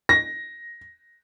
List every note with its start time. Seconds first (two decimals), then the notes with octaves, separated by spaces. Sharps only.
0.09 A#6